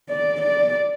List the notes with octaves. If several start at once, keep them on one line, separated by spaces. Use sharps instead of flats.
D5
D5